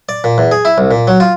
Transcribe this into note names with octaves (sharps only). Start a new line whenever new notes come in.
D5
A#2
E2
G#4
E4
C2
A#2
F#3
F4